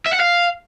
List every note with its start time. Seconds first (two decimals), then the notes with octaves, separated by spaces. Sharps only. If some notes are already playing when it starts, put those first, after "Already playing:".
0.07 E5
0.13 F#5
0.20 F5